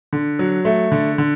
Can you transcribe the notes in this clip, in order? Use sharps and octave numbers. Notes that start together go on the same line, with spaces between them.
D3
F#3
A3
D3
D3